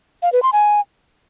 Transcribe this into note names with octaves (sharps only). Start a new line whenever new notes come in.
F5
B4
C6
G#5